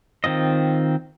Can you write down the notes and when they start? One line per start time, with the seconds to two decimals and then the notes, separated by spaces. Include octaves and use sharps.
0.24 D#3 C4 F4 D#5